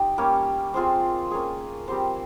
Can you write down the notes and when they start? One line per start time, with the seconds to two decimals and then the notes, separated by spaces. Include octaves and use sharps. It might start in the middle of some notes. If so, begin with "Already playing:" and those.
Already playing: D#4 F4 G4
0.18 G3 A#3 C#4
0.74 C4 F4 G#4 C5
1.31 A#3 C#4 G#4
1.88 G3 C4 G4 C5